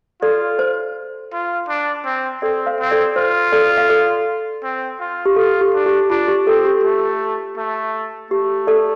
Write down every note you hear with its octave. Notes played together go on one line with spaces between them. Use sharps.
F4 A4 D5
C5
F4
D4
C4
C4 A4 D5
C5 F5
C4
A4 D5
F4 C5
A4 D5
F5
A4 D5
C4
F4
G4
F4 A4
G4
D4
G4
D4 F4
G4
C4 A4
G4
A3 G4
A3
A3 G4
A4 D5